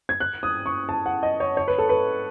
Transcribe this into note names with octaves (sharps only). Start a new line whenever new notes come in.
G#6
F#6
D#6
C#6
A5
F#5
D#5
C#5
C#5
B4
A4
B4